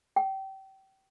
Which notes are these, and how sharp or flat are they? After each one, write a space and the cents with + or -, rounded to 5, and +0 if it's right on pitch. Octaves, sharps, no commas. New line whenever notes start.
G5 -30